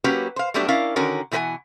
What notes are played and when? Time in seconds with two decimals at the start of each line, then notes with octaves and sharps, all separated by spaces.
0.04 F#3 A#3 C#4 F#4 G4 B4
0.36 C5 F5
0.54 F#3 G3 A3 B3 D4 G4
0.68 C#4 E4 A#4 D5 F5
0.96 D3 D#3 C#4 F#4 A#4
1.31 B2 E3 G4 B4 F#5 G#5